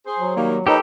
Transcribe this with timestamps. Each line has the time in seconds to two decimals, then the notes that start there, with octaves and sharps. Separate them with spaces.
0.06 G#4 C5
0.20 F#3
0.37 D#3 G3 A#3
0.67 F3 A#3 D#4 G4 A4 B4 C#5